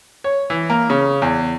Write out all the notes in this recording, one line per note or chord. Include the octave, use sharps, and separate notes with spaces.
C#5
E3
A#3
C#3
E2